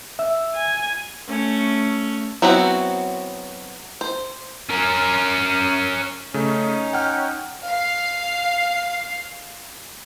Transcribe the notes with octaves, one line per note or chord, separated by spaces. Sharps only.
E5 E6
G#5
A3 C#4
F#3 B3 C4 E4 F#4
C5
C#4 A#4
C#3 A3 C#4 D#4
F#5 G5 F6
F5 C7